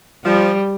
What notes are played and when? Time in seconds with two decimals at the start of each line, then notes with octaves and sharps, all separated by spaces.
0.25 F3 G3